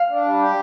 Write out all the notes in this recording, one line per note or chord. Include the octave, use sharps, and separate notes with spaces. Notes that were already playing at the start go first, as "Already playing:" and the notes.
Already playing: F5
D4
G3
G4